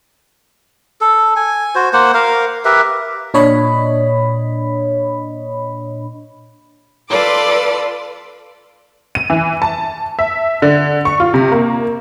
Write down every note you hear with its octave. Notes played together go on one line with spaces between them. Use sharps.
A4
G#5
F#4 C5
A#3 C5 F#5
A#4 F5
G4 A#4 B4 E5
A#2 D4 C#5 D#5 B5
F4 A4 B4 D5 C6 D6
D#7
E3
A5
E5
D3
C#6
F4
C3
A#3